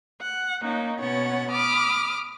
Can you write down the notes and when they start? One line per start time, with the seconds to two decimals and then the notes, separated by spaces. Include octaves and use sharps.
0.23 F#5
0.63 A#3 C#4 D#4
1.01 B2 B3 C#4 C#5 F#5 A6
1.50 B5 D6 D#6 F6